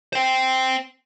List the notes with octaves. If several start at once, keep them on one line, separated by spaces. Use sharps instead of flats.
C5 G5